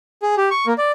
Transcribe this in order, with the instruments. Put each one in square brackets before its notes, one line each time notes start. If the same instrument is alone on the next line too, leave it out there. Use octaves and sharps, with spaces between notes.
[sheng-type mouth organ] G#4
G4
C#6
A#3
D5